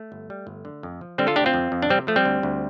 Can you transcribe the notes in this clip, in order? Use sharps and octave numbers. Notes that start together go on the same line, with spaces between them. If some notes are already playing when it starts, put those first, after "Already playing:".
Already playing: A3
G1
G3
G1
D3
F2
F3
D3 G3 C4
F4 A4
D2 D4 G4
C4 F4
F2
F2
D4
C3 G3 C4
F3 A3
G3 C4
D2
D2